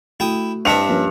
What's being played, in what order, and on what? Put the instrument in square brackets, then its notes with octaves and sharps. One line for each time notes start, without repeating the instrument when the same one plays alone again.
[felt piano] A3 F#4 [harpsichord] E4 G5 D#6
[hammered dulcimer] G2 [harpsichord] C4 D#5 E5 [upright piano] A5 C#7 F7
[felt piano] F3 A#3 C#4